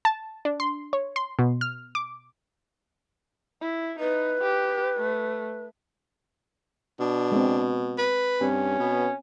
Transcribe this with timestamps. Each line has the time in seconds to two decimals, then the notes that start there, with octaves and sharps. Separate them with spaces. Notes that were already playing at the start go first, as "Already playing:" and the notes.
0.05 A5
0.45 D4
0.60 C6
0.93 C#5
1.16 C6
1.39 B2
1.61 F6
1.95 D6
3.61 E4
3.99 D#4 B4
4.42 G4
4.98 A3
7.00 B2 D4
7.32 G#3 C4
7.98 B4
8.41 G2 C4 C#4
8.79 B2 B3